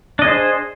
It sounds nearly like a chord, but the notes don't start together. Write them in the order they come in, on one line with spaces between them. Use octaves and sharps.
D4 D#5 G#4 C5